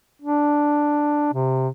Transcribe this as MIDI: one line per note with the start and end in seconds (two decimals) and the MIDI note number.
0.22 1.33 62
1.33 1.68 48